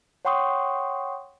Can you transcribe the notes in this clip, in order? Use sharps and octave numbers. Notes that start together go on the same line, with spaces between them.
C#5 F#5 G5 C6 C#6 D#6